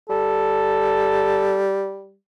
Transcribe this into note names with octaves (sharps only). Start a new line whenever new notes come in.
G3 A4